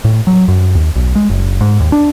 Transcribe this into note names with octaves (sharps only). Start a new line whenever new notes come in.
A2
F#3
F#2
D#2
B1
G#3
F#1
G#2
D#2
D4